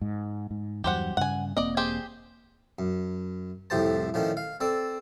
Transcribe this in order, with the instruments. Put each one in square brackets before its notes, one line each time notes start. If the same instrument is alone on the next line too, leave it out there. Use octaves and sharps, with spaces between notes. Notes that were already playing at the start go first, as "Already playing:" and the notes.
[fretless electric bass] G#2
G#2
[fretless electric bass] E2 G2 F#3 [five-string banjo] G4 C5 F#5
[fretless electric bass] G2 C#3 [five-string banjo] F#5 G#5
[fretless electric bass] E1 A#3 C4 [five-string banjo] D5 D#5
[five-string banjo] G4 G#4 C5
[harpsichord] F#2
C2 F2 A2 G4 C5 A5
A2 D#3 F3 C#4
F5
C4 A4 D5